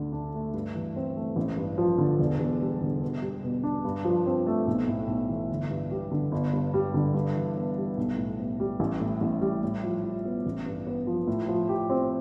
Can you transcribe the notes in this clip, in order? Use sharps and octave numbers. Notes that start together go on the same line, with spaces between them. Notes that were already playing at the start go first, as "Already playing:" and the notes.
Already playing: D2 D3
D4
A3
G2
E3
C4
A3
A1
G2
F3
D3
E1
E2
G3
D3
B2
G3
B2
D4
G2
F3
C4
A3
B1
A2
B1
E3
G1
G2
G3
D3
G1
G2
G3
D3
G2
E3
B3
G3
B1
A2
B3
G3
A1
A2
A1
G3
A2
F3
E4
B3
A1
G2
B3
F3
A2
F3
G4
C4